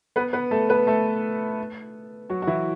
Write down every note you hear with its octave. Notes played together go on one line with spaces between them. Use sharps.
B3 B4
B3 B4
A3 A4
B3 B4
A3 A4
F#3 F#4
F#4
E3 E4